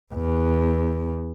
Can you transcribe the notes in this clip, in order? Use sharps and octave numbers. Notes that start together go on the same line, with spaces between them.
E2